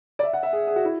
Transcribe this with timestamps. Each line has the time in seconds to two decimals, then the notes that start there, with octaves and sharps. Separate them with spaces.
0.19 D5
0.23 E5
0.33 F#5
0.43 E5
0.53 G#4
0.67 G#4
0.76 F#4
0.85 E4